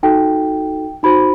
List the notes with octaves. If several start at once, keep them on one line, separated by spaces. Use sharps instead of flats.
D#4 F#4 A4 G5
D#4 F#4 C5 B5